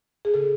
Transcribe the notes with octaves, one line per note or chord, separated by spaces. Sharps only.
G#4
C#3 A4